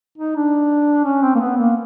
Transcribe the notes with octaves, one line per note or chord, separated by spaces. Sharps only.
D#4
D4
C#4
C4
A#3
B3
A#3